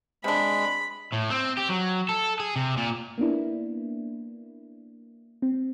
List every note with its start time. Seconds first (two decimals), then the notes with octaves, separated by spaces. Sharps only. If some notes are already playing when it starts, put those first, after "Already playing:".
0.24 C3 G#3 D4 B5
1.13 A2
1.31 C4
1.58 G4
1.69 F#3
2.09 A4
2.40 G#4
2.56 C3
2.77 A#2
3.18 A#3 B3 D4 E4
5.42 C4